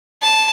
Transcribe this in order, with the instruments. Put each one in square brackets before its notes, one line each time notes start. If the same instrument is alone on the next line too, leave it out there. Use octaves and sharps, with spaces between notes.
[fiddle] A5